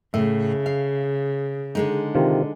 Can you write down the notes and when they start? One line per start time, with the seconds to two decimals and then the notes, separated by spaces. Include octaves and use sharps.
0.14 A2 C#3 E5
0.66 F5
1.75 D3 G#3 D#4
2.15 C3 D#3 F4